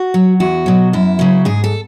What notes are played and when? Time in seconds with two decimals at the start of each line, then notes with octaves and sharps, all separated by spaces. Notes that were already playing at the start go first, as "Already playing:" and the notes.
Already playing: F#4
0.14 F#3
0.40 E2 F#4
0.66 B2 F#3
0.93 F#2 E4
1.19 C#3 F#3
1.45 G#2 G#4
1.64 A4